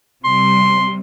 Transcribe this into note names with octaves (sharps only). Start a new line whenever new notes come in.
C3 G3 C6